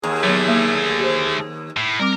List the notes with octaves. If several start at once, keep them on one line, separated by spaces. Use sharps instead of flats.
D#2 G#4
D3 F#3 A3 B3
A#3
G4 C5
A2
G3 C4 A#4 D6